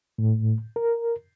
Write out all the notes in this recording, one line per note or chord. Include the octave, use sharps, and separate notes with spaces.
A2
A#4